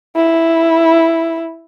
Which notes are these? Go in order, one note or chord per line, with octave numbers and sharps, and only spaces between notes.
E4